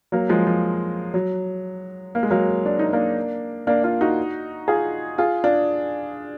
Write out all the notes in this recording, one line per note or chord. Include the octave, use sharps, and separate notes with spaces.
F#3 A#3
F3 G#3
F3
F#3
A#3
G#3
F#3 A#3
D4
D#4
A#3 D4
A#3 D4
D4 F4
D#4 F#4
F4 G#4
F4 G#4
D4 F4